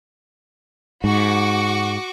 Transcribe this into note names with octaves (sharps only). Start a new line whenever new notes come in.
G#2 F#4 C#6 D6